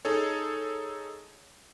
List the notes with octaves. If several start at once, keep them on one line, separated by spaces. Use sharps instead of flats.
D#4 G#4 A4 C#5